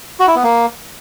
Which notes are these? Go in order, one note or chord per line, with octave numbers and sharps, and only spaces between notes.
F#4
E4
B3
A#3